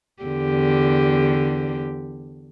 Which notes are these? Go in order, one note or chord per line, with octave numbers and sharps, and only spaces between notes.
E2 D3 G4